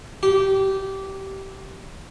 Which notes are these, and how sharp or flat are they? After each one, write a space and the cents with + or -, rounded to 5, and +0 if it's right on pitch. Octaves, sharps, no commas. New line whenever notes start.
G4 -20